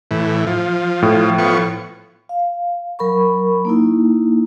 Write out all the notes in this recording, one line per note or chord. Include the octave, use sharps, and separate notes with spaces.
A2 E3
F3
A2
F3 B3 C#6
F5
F#3 A#4 B5 C#6
A#3 D#4 E4